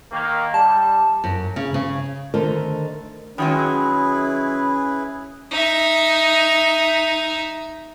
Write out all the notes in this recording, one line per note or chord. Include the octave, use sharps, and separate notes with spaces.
D#3 A#3
G3 A5
F#2
C#3
C#3
D3 D#3 A3 A#4 C5
D#3 F#3 G#3 C#4 E4 G#4 B4
D#4 E5